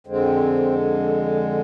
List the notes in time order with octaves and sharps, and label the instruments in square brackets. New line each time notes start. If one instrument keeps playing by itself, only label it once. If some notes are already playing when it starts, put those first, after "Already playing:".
[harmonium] F2 D3 G#3 C4